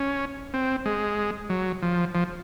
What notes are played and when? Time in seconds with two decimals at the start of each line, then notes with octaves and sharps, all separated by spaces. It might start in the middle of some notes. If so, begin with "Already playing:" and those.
Already playing: C#4
0.54 C4
0.86 G#3
1.50 F#3
1.82 F3
2.15 F3